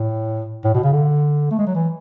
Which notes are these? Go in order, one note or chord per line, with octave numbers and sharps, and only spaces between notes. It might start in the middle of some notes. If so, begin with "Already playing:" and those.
Already playing: A2
A2
B2
C#3
D3
A3
G#3
F#3
E3